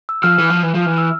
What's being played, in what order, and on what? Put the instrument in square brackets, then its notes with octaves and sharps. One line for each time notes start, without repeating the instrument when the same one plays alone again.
[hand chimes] E6
[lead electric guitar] F3 [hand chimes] F6
[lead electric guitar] E3
F3
E3
F3
[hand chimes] F6
[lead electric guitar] E3
[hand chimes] E6